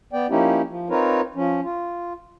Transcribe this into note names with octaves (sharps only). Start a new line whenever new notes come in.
B3 D5 G5
F3 A#3 C#4 D#4 E4 G4
F3
C4 D#4 F4 A#4 B4 C#5
F3 C#4
F4